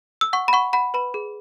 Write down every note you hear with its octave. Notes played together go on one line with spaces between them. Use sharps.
E6
F#5 C#6
B5
F#5 C#6
F#5 B5
B4 B5
G#4